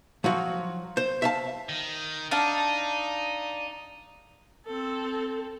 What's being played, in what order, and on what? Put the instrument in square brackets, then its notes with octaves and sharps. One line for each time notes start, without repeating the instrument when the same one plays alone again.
[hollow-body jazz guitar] F3 F#3 F#4
C5
E5 F5 A5
[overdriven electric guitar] D#3
[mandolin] D4 F5 A5 [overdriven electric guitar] D#4
[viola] C4 A4